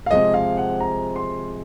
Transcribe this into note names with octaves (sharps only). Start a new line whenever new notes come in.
F5
C3 F3 G#3 D#5
F5
F#5
A#5
C6